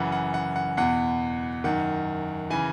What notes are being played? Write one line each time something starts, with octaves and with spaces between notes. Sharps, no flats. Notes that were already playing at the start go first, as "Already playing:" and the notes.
Already playing: F#2 C#3 E3 F#5
F#5
F#5
F#5
E2 B2 F#5
F#2 D#3 F#5
C#3 E3 G#5